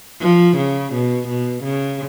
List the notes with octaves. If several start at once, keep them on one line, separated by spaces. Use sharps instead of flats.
F3
C#3
B2
B2
C#3